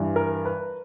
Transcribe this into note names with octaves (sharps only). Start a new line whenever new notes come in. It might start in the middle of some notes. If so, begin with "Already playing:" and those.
Already playing: G2 E3
A#4
B4